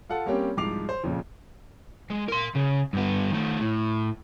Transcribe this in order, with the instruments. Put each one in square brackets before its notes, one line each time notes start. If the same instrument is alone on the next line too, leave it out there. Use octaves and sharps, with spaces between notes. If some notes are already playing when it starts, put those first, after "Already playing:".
[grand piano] F4 A4 F#5 A5
G3 A#3 C4 C#4 G4
C2 G#2 F3 D6 C7 F7
C5
F2 A#2 C#3
[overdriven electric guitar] G#3
A#4 C6
C#3
G2 B3
D#3 A3
A2